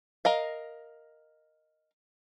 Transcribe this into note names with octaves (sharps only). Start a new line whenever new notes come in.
A#4 D#5 F5